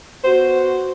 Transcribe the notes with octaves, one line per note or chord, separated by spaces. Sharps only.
B3 F#4 C5